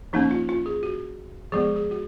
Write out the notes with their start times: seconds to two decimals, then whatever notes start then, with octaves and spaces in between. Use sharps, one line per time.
0.13 F3 A#3 C#4 D#4
0.31 F4
0.49 F4
0.66 G#4
0.83 F#4
1.52 F3 G#3 B3 G#4
1.76 G#4
1.91 F#4